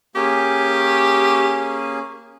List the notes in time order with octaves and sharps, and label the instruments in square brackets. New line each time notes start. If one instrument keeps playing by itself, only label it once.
[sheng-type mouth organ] A#3 C#4 G#4 [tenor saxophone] G4